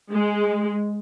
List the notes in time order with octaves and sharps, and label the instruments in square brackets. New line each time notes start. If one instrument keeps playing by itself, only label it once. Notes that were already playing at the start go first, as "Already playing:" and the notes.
[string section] G#3